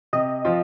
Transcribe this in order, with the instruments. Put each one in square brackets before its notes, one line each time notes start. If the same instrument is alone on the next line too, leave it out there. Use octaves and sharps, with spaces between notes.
[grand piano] C3 [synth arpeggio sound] D#5
[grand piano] F3 C4 F4